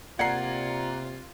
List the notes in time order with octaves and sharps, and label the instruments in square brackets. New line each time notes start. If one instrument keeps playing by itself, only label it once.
[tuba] C3 [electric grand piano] A#3 D5 G#6 [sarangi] F4 [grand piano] F#5 A#5 C7